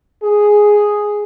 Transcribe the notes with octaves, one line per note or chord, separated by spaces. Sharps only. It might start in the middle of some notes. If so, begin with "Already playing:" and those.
G#4